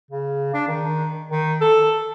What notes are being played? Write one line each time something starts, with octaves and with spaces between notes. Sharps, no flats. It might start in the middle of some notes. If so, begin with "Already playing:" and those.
C#3
D4
D#3
D#3
A4